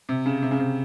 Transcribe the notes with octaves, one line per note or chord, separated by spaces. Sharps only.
C3
C#3
C3
C#3
C3